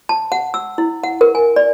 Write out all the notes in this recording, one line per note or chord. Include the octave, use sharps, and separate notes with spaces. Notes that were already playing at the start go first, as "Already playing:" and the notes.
A5
F#5
E6
E4
F#5
A#4
G#5
D5